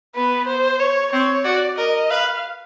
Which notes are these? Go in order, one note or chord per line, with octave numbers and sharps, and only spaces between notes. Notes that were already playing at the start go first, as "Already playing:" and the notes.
B3 B4
C5
C#5
C4 C#5
F#4 D5
A#4 D#5
B4 F5